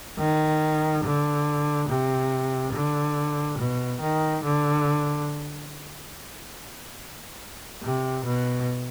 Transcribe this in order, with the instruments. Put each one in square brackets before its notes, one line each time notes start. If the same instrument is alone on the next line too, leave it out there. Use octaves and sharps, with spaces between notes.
[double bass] D#3
D3
C3
D3
B2
D#3
D3
C3
B2